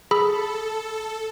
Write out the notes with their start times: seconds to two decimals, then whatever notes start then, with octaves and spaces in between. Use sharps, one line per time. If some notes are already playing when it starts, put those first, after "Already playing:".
0.11 G#4 A4 B5 E6